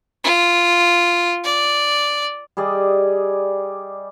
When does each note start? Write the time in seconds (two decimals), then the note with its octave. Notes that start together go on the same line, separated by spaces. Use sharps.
0.24 F4
1.44 D5
2.57 G3 G#4 D5 D#5